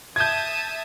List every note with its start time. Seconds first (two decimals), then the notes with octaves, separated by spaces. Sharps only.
0.16 E5 A5 D#6 G6 G#6